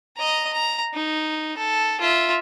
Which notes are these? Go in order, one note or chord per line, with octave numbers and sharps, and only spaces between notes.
D#5 A#5
A#5
D#4
A4
F4 E5